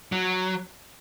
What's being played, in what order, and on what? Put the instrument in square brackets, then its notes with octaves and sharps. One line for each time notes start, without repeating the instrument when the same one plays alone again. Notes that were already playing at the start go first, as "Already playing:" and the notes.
[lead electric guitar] F#3